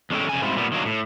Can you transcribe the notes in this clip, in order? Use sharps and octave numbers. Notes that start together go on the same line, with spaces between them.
E2 G#3 C#4 D4 A4 G5
F2 C#3 G#5
G#2 G3 C4 E4 F4
A#2 G3 B3
D#3 F#3 A#3 D4
A2